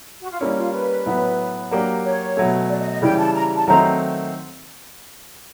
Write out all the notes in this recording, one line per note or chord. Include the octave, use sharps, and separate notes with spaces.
F#4
F4
G3 A#3 C#4 E4
F4
B4
A2 F#3 B3
F#3 A#3 D4 G4
C#5
B2 F#3 A3
D5
D#5
D#5
C#3 E3 G3 G5
A5
A#5
A5
D#3 F#3 A3 C4 D#4 A#5